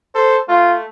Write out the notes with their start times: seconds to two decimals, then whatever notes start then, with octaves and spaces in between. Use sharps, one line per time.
0.15 A4 C5
0.49 A3 F4